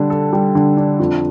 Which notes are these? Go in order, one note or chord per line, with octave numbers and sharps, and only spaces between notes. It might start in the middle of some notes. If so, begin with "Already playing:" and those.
Already playing: D3 G3 D4
A4
G3
D3
D4
F2